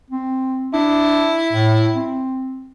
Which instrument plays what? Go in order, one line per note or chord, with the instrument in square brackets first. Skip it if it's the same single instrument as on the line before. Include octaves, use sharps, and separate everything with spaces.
[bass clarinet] C4
[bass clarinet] D4 [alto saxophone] E4
[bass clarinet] A2
C4